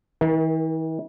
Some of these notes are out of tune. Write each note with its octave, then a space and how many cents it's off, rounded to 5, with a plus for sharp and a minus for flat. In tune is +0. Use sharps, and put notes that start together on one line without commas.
E3 -45 A#4 +25